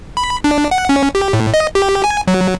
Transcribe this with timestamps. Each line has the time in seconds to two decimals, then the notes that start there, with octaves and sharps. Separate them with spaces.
0.17 B5
0.44 D4
0.71 F#5
0.89 C#4
1.15 G4
1.33 A2
1.54 D#5
1.75 G4
2.04 G#5
2.27 F#3